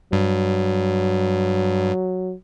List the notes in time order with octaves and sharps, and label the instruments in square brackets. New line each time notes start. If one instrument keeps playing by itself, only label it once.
[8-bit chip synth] G2 [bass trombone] F#3